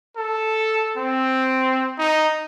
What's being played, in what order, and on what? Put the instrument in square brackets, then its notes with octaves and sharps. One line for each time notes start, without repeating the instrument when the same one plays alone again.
[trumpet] A4
C4
D#4